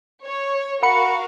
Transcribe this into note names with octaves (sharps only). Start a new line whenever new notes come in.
C#5
F#4 A#4 F5 F#5 B5 C#7